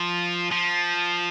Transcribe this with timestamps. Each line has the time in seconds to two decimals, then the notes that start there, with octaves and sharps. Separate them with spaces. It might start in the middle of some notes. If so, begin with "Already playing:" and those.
Already playing: F3
0.51 F3